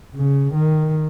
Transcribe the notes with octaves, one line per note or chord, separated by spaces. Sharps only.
C#3
D#3